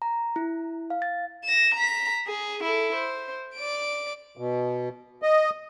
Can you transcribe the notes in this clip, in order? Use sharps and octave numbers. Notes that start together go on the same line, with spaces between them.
A#5
E4
F5
A6
A#6 E7
A#5 B6
G#4
E4 A4
C5
D5 D7
B2
D#5